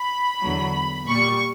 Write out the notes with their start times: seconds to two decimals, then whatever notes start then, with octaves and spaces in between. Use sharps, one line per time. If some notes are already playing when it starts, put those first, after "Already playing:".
Already playing: B5
0.44 E2 D3 F#3
1.07 A#2 G3 C#6